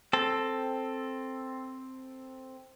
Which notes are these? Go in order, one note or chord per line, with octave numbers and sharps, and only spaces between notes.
C4 A4